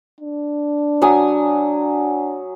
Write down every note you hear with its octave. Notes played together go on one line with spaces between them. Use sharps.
D4
F#3 G#5 D#6